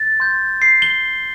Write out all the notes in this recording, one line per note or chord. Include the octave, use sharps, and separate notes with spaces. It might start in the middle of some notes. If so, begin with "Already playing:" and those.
Already playing: A6
C6 G6
C7
G7